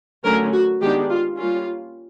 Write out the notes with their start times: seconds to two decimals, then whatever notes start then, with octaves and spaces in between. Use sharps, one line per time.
0.24 D3 F#3 A3 C#4 A#4
0.53 F#4
0.80 D#3 G#3 B3 D4 G4
1.09 F4
1.37 G3 A#3 C#4 F4